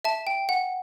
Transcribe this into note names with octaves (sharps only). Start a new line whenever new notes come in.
E5 A5
G5
F#5